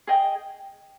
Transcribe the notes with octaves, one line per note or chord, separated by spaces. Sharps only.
G#4 D#5 G5